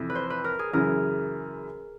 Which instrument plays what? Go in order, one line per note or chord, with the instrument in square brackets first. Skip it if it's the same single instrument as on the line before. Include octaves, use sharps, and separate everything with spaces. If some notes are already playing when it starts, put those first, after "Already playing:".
Already playing: [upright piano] F2 C3 E3
[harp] B4
C5
B4
A#4
G#4
[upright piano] F#2 C#3 E3 [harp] A#4